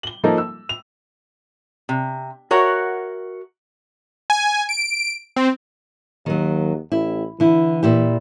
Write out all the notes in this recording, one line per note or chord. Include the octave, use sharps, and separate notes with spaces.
F#7 G7
F3 A#3 D#4 A4
E6
F7
C3
F#4 A#4 C#5 E5 F#5
G#5
D7
C4
D#2 D#3 F#3
A1 E4
D3 E3 E4
A#2 E4 G4